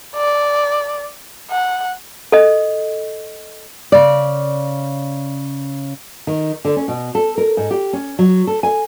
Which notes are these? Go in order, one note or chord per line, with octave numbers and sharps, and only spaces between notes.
D5
F#5
A4 D#5
C#3 D5
D#3
D3
C#4
B2
A4
A#4
G#2
G4
C#4
F#3
A4
G#5